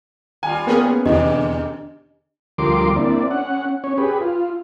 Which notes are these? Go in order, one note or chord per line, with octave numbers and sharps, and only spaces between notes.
D#2 G3 F4 G#5
A#3 B3 C#4 G#4
E2 G#2 B2 D3 D4 G4 D#5
D2 F3 G3 A#4 C6 D6
A#3 C4 D4 E4 D5
C#4 F#5
C#4 C#5
G4 G#4 B4
F4